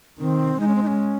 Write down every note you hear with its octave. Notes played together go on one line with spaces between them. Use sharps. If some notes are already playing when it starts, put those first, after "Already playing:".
D#3 C4
G#3 D#4
C#4
C4
D#4
C#4